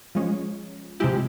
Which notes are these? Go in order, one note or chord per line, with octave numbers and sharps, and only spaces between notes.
F3 G#3 C#4
C3 F3 G#3 E4 G4